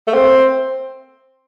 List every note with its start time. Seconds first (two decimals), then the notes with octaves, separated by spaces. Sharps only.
0.07 A3
0.14 C4